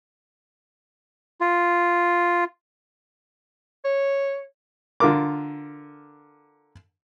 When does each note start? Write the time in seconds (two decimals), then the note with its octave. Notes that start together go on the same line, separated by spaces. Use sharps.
1.41 F4
3.85 C#5
5.00 D3 F4 A#4 D6